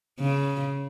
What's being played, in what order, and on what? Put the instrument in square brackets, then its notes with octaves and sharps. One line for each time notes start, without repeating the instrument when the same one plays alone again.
[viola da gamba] C#3